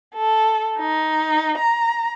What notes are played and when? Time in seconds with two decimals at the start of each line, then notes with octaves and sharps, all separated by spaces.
0.15 A4
0.78 D#4
1.58 A#5